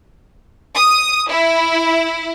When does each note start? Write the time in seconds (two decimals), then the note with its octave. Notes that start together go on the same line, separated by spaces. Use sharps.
0.75 D#6
1.30 E4